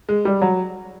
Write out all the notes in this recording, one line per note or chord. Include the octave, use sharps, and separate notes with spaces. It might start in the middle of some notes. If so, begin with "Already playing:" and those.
G#3
G3
F#3